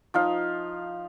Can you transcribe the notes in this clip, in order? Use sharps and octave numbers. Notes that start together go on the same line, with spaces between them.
F3 D#4 F5